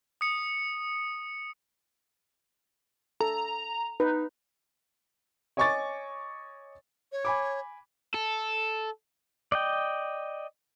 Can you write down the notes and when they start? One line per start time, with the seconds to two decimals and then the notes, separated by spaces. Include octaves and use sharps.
0.21 D#6 C#7
3.21 A4 A#5
4.00 D#4 B4
5.57 C#5 D#5 G#5 C#6 D6 A6
7.12 C#5
7.25 G#5 B5 D6
8.14 A4
9.52 D5 D#5 G5